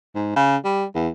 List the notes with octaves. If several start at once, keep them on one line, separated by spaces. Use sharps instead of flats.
G#2
C#3
G3
E2